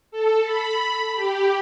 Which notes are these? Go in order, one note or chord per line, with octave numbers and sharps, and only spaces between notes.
A4
B5
G4